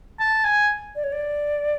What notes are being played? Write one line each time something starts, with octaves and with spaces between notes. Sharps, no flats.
A5
G#5
D5
C#5
D5